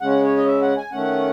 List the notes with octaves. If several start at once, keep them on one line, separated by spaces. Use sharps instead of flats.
C#3 G#3 C#4 F#5
C#5
D#5
E5
F#5
G#5
D#3 A3 C#4 F#5